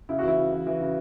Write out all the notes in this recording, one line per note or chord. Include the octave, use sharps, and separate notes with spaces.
C#3 E4
F#4
E3 E4
C#3
E3
E3
C#3